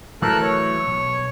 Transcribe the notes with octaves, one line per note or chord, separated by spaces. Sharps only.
E3 F#3 A3 A4 A#4 F#6
C#5
B1